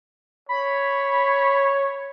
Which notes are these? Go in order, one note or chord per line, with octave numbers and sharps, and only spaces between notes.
C#5 B5